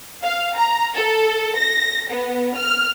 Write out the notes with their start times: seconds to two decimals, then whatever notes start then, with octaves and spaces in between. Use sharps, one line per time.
0.23 F5
0.58 A#5
0.95 A4
1.58 A#6
2.10 B3
2.57 F6